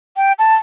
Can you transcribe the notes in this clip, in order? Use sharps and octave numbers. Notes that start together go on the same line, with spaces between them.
G5
A5